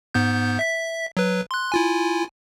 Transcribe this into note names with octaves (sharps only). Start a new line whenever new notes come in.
G#2 B3 G6
E5 B6
F#3 B4
C6 F#6
E4 F4 G#5